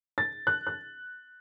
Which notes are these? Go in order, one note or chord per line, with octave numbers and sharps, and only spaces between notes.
A6
F#6
F#6